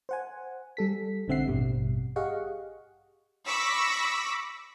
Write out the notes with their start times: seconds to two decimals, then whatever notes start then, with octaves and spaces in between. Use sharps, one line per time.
0.09 C5 F#5 G#5
0.77 G3 A4 B6
1.28 A#1 D3 C4 E5 F#5 C7
1.47 A1 G2 B2 G3
2.16 G4 G#4 D#5 F5 F#5 C#6
3.47 B5 C#6 D6 E6 A#6 B6